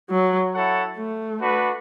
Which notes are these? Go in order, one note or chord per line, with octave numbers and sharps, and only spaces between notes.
F#3
E4 A4 C#5 F#5
A3
D4 F#4 B4